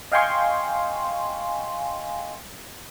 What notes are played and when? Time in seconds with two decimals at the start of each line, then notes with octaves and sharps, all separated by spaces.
0.12 D#5 F5 G5 G#5 C6 C#6